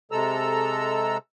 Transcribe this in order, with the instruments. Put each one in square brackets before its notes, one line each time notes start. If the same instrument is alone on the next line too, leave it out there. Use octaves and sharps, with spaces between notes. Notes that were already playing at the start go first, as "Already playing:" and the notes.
[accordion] C3 G#3 A4 A#5 E6